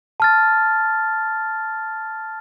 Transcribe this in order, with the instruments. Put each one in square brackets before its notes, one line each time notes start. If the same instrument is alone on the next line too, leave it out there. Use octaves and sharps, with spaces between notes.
[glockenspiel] A5 F6 A6